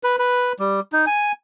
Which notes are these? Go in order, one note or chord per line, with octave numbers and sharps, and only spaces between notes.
B4
B4
G3
D#4
G#5